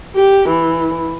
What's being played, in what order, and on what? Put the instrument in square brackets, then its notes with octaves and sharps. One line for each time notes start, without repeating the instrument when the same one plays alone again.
[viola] G4
E3